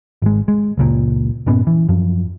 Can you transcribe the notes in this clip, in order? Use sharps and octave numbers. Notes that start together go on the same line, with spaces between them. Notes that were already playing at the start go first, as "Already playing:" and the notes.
G#1 G#3
G#3
F#1 C#2 A#2
G2 A#2 B3 C#4
E3
F#2 F3